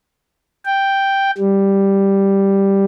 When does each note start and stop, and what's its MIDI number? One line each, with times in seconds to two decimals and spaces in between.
0.65 1.31 79
1.37 2.85 55